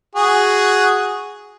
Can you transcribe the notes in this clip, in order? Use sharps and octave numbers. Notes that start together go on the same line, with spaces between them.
F#4 G#4